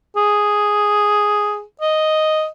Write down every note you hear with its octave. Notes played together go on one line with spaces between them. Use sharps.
G#4
D#5